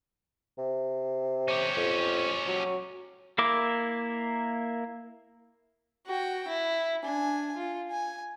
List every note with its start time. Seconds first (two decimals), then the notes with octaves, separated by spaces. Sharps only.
0.58 C3
1.48 C#4 G4
1.77 F2
2.48 F#3
3.38 A#3 E4 A#4 D6
6.06 F#4 G5
6.48 E4
7.04 D4 G#5
7.56 F4
7.91 G#5